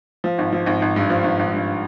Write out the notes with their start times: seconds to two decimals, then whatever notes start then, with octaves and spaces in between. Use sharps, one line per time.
0.24 F3
0.38 G#1
0.52 F3
0.66 G#1
0.82 G#1
0.96 G2
1.10 F3
1.24 G#1
1.39 G#1
1.53 G2